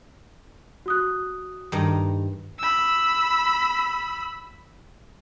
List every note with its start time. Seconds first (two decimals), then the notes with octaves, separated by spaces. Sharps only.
0.86 F#4 D#6 F#6
1.72 G2 D#3 A#5
2.59 B5 E6